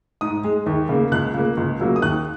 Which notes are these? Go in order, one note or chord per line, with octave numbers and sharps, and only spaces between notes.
G#2 D#6
G#3
D#2
C#3 A#3
C#2 F#6
C#3 A#3
C#2
C#3 F#3 A#3
D#6
D#2 F#6